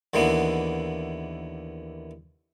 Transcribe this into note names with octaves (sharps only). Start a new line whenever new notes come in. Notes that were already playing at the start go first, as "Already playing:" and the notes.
D#2 D3 E3 A#3 B3